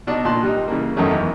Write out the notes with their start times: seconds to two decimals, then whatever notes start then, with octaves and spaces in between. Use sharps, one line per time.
0.07 B2 D4 D#4
0.25 A#2 A5 C6 F#6
0.43 G3 D#4
0.68 C#3 E3 A#3
0.96 F#2 D#3 F#3 A3 C#4
1.11 E2